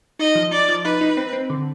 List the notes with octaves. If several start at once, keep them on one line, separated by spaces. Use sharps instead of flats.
D#4 D#5
F3
D#4 D5
F3
D#4 B4
D#4
C4
C4
D3